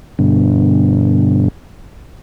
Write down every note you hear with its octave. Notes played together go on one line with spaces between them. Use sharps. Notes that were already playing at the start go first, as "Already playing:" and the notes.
G2 B2 D3